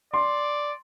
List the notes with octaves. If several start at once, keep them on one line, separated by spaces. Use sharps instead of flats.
D5 C6